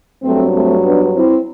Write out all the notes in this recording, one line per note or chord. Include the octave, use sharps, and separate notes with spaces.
G2 F#3 A3 C4
A3 C4
B3 D4
C4 E4